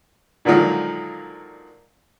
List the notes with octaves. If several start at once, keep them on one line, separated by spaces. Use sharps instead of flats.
A#2 D3 D#3 F3 F#3 G#3